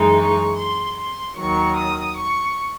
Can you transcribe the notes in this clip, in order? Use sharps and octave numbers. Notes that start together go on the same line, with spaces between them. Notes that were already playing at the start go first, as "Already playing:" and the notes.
Already playing: F#2 E3 G#3 D#4
C#6
C6
C6
D#2 D#3 F#3 C#6
D#6
C#6